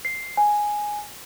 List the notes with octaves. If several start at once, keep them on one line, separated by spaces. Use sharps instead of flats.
C7
G#5